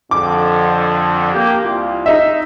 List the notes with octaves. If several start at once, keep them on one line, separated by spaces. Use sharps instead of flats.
F2 D3 D6
A#3 G4
C2 F4
D#4 E5